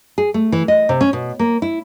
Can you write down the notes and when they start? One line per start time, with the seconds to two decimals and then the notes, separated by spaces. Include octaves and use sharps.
0.18 G#4
0.34 A3
0.52 E3
0.68 D#5
0.89 C3
1.01 C#4
1.13 B2
1.39 A#3
1.62 E4